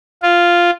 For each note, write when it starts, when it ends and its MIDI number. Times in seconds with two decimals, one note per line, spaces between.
0.22 0.70 65